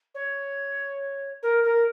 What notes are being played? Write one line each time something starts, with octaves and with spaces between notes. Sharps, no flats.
C#5
A#4
A#4